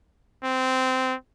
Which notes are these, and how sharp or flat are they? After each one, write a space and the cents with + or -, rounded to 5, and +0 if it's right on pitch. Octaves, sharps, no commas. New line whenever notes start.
C4 -15